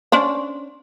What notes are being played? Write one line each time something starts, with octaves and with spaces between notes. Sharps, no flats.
C#4 D4 C5